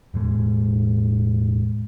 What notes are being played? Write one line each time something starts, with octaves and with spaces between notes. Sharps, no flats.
E1 A2 G#3